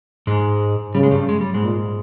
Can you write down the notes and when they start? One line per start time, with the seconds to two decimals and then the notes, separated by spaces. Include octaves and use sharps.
0.27 G#2 G#3
0.95 C#3 G3
1.03 G#3
1.11 G2 G3
1.29 G#3
1.41 G3
1.54 G#2 G#3
1.63 A#2